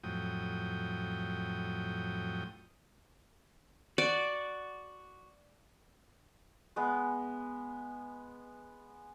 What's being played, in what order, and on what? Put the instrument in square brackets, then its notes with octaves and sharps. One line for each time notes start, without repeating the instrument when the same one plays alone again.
[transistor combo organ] F2 A2 F#3 G5 D#6
[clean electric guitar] F#4 [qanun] D5
[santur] G#3 B3